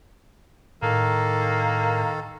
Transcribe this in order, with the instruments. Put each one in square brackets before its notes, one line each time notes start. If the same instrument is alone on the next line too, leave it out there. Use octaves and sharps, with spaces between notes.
[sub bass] A2 [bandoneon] D#3 A4 [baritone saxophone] A#3